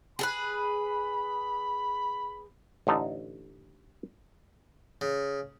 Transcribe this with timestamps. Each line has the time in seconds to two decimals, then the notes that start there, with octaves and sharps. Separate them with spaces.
0.19 G#4 A4 B4 B5
2.87 A1 D3 D#4 A5
5.01 C#3